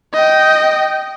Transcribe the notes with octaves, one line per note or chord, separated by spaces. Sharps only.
D#5 G5